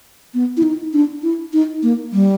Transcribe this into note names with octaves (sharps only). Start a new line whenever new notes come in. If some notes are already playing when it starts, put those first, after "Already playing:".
B3
E4
D#4
D4
E4
D#4
A#3
G3